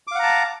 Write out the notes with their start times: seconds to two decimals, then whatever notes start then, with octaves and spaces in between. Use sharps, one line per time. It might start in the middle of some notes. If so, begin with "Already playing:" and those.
0.07 D6
0.11 F5
0.15 F#5
0.19 A#5
0.23 A5